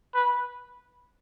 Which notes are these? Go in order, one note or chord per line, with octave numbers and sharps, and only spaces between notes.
B4